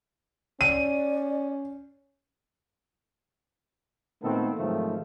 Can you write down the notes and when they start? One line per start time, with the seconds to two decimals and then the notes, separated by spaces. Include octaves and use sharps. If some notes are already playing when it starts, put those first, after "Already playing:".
0.61 C#4 D5 D#7
4.22 A#2 D#3 A3 B3 C4 A4
4.58 G#2 C3 D#3 F3 F#3 A3